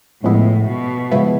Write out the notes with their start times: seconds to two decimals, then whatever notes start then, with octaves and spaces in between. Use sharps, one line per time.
0.23 A2 C#3 F3 G#3 B3 E4
0.67 B2
1.11 C#3 F3 G#3 B3 E4